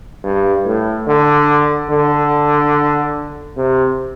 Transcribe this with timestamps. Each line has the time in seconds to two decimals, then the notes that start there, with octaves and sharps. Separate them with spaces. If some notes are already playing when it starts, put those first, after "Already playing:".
0.24 G2
0.65 A2
1.07 D3
1.90 D3
3.57 C3